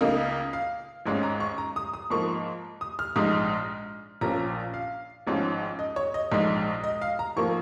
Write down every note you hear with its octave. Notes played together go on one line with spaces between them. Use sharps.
C#2 C#3 A#3 D#4
F5
G#1 G#2 G#3 C#4
A#5
C#6
A#5
D#6
D#6
G#2 F3 A#3 C#6
D#6
F6
A#1 G#2 G#3 D#4 D#6
A#1 A#2 F3 C#4 A#5
F5
G#1 G#2 F3 C#4
D#5
C#5
D#5
A#1 G#2 G#3 D#4
D#5
F5
A#5
G#1 F3 A#3 C#6